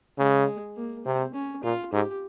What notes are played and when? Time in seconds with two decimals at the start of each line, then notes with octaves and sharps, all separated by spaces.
0.18 C#3 G#3
0.76 A#3
1.05 C3 C4
1.34 C#4
1.64 A#2 F4
1.92 G#2 G4